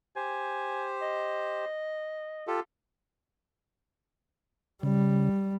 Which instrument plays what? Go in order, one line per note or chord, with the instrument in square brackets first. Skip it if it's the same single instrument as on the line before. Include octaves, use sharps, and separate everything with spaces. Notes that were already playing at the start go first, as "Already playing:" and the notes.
[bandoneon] G4 C5 [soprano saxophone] G#5
[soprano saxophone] D#5
[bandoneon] F4 G4 A4
[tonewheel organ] C#3 [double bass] G3